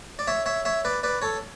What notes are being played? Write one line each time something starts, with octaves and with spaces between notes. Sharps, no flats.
D5
C#5 E5
C#5 E5
C#5 E5
B4 D5
B4 D5
A4 C#5